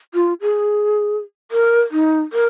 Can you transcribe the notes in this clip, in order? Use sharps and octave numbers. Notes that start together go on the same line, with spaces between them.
F4
G#4
A#4
D#4
A#4